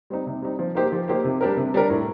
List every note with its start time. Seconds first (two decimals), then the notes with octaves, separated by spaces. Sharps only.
0.10 G3 C4 D#4
0.26 C3
0.42 G3 C4 D#4
0.59 F3
0.75 A#3 D#4 G4 C5
0.92 F3
1.08 A#3 D#4 G4 C5
1.24 C3
1.41 G3 D4 G4 A#4
1.57 C3
1.74 G3 D4 G4 A#4
1.90 A2